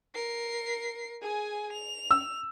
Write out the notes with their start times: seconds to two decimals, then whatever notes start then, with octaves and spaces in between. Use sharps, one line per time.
0.15 A#4 C7
1.22 G#4 G#5
1.72 F7
2.11 E6